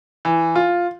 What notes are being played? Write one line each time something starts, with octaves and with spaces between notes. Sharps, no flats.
E3
F4